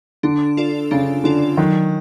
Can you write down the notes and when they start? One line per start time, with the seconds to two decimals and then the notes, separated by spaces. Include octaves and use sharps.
0.23 D3 D4
0.57 F4 A4 D5
0.91 C#3 D4
1.24 D3 F4 A4 D5
1.57 D#3 F#3